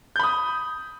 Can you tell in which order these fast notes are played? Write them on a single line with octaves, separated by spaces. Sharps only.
G6 B5 D#6